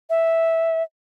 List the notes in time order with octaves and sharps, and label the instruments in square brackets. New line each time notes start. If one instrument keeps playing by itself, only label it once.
[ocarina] E5